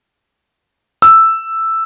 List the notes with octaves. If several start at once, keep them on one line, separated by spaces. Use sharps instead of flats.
E6